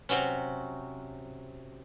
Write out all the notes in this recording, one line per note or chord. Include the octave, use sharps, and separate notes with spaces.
C3 F#3 C#4